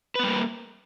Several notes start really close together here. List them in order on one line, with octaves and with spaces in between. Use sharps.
B4 B3 G3 A#3